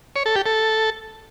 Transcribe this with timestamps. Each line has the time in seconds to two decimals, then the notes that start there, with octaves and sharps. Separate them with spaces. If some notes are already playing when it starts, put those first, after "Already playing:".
0.16 C#5
0.26 A4
0.36 G4
0.46 A4